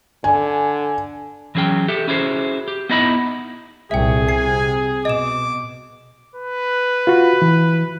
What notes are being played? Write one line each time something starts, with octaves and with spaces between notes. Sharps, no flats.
D3 G#5
E3 F#3 C#4 G#4 G5
G4 A4 E5
C#4 E4 F#4 G#4 C5
G4
B3 D#4 E4 D#5 E5 B5
C2 A#2 G#4 E5 G5
C3 G#5 C7
B2 D#5 D6 E7
B4
F4 F#4
E3